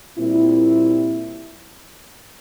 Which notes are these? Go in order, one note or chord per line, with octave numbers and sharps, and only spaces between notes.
A#2 G3 C4 E4